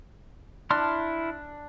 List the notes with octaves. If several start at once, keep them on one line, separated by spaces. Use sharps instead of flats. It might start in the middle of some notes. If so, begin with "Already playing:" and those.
D4 E4 C6 F6